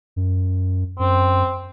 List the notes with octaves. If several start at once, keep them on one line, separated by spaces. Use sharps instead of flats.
F#2
F#2 C4